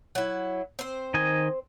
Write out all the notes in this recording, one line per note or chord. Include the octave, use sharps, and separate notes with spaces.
F#3 E4
C4 C5
D#3 D#5 G#5